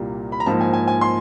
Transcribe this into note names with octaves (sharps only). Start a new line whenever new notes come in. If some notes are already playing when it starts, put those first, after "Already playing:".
Already playing: C2 A#2 G3 A#3
B5
A#5
G#2 F3 A#3 A5
G#5
G#5
G#5
C6